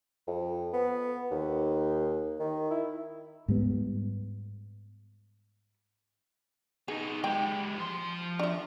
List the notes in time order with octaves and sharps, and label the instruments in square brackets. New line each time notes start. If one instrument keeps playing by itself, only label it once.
[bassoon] F2
B3
D#2
D#3
E4
[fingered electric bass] G#2 G3 B3
[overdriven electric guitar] B3 D#4 [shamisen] G#4
[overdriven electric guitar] G#3 G4 [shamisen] G5
[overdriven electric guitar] F3 C6
[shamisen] D4 E5